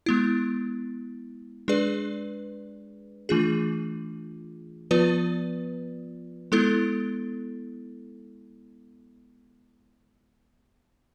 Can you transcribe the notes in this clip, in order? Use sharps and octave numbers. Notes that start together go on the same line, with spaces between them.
G#3 B3 E4
G#3 D4 G#4 B4 D5
E3 A3 D4 F4 G#4
F3 B3 F4 B4 D5
G#3 B3 E4 A4